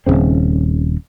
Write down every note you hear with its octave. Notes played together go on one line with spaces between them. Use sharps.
D#1 B1 C#3 C4